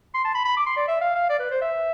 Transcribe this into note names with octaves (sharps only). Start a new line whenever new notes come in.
C6
A5
B5
B5
D6
C6
D5
E5
F5
F5
D5
B4
C5
E5